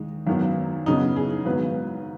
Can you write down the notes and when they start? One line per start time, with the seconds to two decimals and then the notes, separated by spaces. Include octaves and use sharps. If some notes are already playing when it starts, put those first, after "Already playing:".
Already playing: D#2 D#3 G#3 D#4
0.27 G#1 F#2 D#3 F#3 B3
0.86 F#2 C#3 F#3 B3 D#4
1.16 G#4
1.45 G#1 G#2 F#3 B3 B4